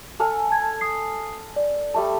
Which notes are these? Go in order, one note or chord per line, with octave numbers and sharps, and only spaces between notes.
A4 F5 G#5
A5 G#6
D#6 C7
D5
G3 A3 A5